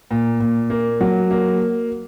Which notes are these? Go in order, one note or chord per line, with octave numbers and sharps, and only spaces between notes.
A#2
A#2
A#3
F#3
A#3